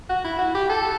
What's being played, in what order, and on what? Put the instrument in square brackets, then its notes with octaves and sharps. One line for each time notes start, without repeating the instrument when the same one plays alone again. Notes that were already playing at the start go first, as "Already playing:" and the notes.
[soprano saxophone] F#4
E4
F#4
G4
A4